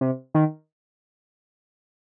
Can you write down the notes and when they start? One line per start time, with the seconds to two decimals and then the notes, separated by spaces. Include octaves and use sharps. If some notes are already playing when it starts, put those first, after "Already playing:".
0.01 C3
0.35 D#3